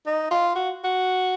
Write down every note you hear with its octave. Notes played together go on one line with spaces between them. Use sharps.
D#4
F4
F#4
F#4